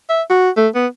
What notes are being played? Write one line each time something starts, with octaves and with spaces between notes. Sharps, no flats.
E5
F#4
A3
B3